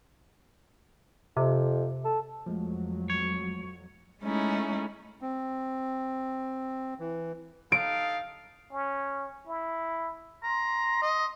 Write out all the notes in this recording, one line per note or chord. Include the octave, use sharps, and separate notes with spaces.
F2 C3
A4
F2 F3 F#3 G#3 A3
C#5
G#3 A3 C#4 D#4 E4
C4
E3
D#4 A4 F5 D7
C#4
E4
A#5 C6
D#5